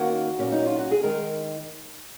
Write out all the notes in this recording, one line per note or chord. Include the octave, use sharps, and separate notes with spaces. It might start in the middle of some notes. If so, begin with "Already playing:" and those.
Already playing: D#3 A#3 C#4 F#4
A#2 F#3 C#4
D#4
F4
F#4
G#4
D#3 G#3 A#4